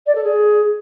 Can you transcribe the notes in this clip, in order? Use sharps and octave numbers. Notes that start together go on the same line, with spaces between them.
D5
A4
G#4